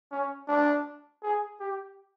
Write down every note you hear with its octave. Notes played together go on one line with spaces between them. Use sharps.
C#4
D4
G#4
G4